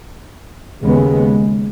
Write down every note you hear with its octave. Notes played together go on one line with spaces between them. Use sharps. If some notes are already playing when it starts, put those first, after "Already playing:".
D#2 C#3 G#3 B3